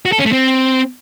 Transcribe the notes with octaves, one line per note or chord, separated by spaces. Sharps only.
F#4
A4
C#4
A3
C4